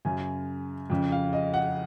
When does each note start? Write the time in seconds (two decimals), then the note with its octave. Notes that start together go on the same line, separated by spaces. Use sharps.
0.05 F#2 C#3 G#5
0.90 F2 C#3
1.12 F5
1.33 D#5
1.54 F#5